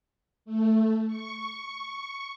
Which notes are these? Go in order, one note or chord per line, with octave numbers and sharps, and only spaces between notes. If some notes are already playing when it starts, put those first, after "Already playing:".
A3
C#6